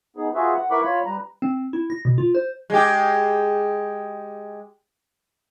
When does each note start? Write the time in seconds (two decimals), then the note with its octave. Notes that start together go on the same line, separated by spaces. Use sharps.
0.16 B3 D#4 G#4
0.35 F4 F#4 G#4 B4 E5
0.54 F#5
0.71 E4 A#4 B4 B5 C#6 D6
0.84 F4 C#5 B5
1.06 G3 B4 A#5
1.42 C4
1.73 E4
1.90 A#6
2.05 B2
2.18 F4
2.35 C5
2.70 G#3 G4